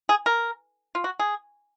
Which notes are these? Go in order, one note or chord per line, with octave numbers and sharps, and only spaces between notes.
G#4
A#4
F4
F#4
G#4